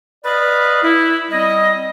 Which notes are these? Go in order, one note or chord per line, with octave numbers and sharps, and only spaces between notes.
B4 D5 D#5 F5 B5
E4
G3 C4 D#5